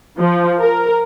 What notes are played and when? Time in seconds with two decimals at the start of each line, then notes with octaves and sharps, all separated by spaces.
0.18 F3
0.60 A#4